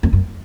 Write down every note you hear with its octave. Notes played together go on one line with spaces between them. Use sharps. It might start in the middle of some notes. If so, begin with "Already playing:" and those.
F2
F#2